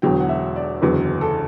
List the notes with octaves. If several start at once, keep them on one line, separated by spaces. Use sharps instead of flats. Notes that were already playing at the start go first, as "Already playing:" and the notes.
E1 E2 D3 F#3 G5
F#5
E5
D5
F#1 E2 D3 F#3 B4
A4